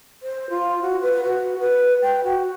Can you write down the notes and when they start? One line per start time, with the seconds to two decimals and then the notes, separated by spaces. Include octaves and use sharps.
0.23 C5
0.50 F4
0.82 F#4
1.02 B4
1.23 F#4
1.59 B4
2.02 G5
2.24 F#4